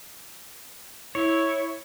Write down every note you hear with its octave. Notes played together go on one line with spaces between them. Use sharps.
E4 C#5